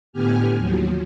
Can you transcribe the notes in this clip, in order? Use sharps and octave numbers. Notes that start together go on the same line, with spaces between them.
A2 D3 B3 G4 G#5 F6
D#2 F3 F#3